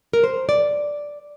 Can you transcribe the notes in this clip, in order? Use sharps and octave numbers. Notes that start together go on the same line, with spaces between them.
A#4
C5
D5